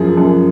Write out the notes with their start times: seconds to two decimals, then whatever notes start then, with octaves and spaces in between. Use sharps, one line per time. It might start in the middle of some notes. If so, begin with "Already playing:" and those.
Already playing: F#2 F3 G#4
0.17 F#2